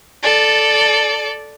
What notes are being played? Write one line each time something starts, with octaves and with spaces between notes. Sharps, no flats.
A4 D5